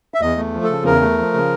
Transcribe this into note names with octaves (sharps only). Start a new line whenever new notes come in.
E5
E2 D#5
A3
F3
C#3 A4
E2 A#4
A3
F3
C#3